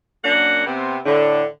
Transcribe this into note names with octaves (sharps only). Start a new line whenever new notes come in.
F#2 A#3 D4 F#5
C3 B3 C4
A2 D3